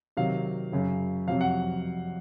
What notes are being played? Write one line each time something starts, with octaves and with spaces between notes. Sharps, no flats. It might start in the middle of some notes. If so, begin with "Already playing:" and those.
C3 D#3 F#3 F5
F#2 C#3 F#3
F2 C3 F#3 F5
F#5